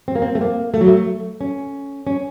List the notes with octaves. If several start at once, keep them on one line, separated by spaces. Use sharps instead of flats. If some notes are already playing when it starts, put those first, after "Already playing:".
C4
A#3
C4
A3
A#3
A3
F#3
A3
C#4
C#4